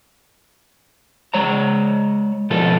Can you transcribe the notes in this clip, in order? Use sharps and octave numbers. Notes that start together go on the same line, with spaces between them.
G#3 C#5 A#5
B2 F3 F4 A4